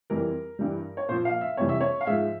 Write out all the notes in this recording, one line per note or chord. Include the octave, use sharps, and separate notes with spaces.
F2 E3 G3 A#4
G2 E3 G3
C#5
A#2 F3 C5
F5
E5
F2 C3 E3 G3 C#5
E5
C#5
F5
G#2 F3 E5